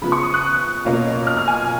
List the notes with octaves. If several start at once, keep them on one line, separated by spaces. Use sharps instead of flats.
C#3 F3 B3 B5
C#6
D#6
F#6
B2 A#3 C#4 F4
F6
F6
G#5